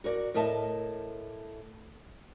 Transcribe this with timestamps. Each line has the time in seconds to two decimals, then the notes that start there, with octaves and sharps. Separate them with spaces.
0.04 F#4 A#4 C#5 D5
0.34 A2 A#4 D#5 E5 A5